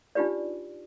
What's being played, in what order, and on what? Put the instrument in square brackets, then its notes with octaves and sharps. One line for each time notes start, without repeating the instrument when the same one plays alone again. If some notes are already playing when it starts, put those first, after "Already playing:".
[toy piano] D4 D#4 F4 G4 B4 D5